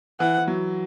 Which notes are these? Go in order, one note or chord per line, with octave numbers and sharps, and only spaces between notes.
E3 F#5
E3
F#3